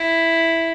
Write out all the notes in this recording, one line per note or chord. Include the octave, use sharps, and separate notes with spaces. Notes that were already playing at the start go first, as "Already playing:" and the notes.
Already playing: E4